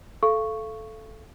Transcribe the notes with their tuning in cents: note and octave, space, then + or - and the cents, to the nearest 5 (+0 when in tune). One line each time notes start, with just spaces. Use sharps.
A4 -10 F5 -30 C#6 +0